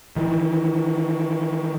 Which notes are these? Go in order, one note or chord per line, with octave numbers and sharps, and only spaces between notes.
D#3 E3